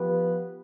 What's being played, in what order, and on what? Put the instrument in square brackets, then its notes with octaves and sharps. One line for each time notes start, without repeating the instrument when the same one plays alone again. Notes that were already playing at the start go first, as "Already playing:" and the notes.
Already playing: [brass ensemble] F3 B3 F4 B4 [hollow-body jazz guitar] G4